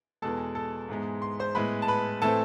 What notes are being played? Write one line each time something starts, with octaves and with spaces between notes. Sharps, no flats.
E2 B2 G#3 A4 A5
A4 A5
G#2 E3 G#3 B3
C6
C5 C6
A2 G#3 B3 B4 B5
A5
B4 B5
A2 E3 A3 C4 A4 A5